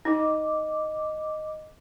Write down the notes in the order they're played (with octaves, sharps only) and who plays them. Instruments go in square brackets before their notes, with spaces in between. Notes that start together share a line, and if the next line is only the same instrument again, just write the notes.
[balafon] D#4 [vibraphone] D#5 D6